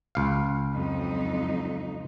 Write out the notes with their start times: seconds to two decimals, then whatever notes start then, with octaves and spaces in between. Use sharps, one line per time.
0.15 C#2 F5
0.72 F2 F#3 D#4